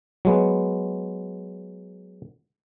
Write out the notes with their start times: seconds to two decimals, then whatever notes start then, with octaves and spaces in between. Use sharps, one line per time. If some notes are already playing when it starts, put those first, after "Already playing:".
0.25 F#3 G#3 B3